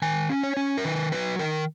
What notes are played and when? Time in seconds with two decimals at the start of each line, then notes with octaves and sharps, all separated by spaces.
0.02 D#3 G#5
0.30 C#4
0.43 C#5
0.57 C#4
0.78 A#4
0.85 D#3 B4
1.12 F#3 B4
1.39 D#3 A#4